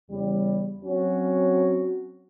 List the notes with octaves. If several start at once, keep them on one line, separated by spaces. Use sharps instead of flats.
E2 C#3 G3
F#3 C4 C#4 F#4